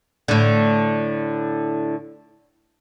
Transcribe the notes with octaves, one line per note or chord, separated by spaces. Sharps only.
A2 D3